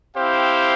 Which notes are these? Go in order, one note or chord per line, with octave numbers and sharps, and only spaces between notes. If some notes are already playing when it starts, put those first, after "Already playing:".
C4 E4 G4 C5 F5